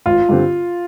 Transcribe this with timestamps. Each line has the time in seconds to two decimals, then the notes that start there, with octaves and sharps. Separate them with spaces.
0.06 G#1 F4
0.29 G2 D3 G3 C4